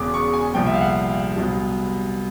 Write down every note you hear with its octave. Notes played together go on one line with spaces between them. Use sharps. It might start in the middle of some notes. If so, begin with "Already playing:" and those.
Already playing: E1 E2 C#3 D6
C#6
G#5
C2 A#2 F3 G5
E5
F5
F#5
F5
C2 B2 F#3